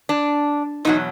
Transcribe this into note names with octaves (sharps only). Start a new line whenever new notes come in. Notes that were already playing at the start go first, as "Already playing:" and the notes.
D4
E2 B2 F#3 D#4